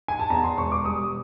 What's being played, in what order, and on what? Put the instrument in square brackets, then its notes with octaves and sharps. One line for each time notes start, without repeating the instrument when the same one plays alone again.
[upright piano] G#5
A5
E2 A#5
C6
E1 C#6
D6
G3 D#6